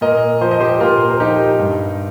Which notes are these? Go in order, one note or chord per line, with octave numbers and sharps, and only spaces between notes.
A#2 A#4 D#5
F3 C5
D#5
G4 C5
A#2 F4 A#4
A#4
F3 D#4 G4
G2